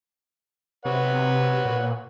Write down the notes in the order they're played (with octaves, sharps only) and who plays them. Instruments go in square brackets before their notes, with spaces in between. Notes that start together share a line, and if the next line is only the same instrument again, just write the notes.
[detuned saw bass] C3 [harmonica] B4 C#5 F#5
[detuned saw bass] A#2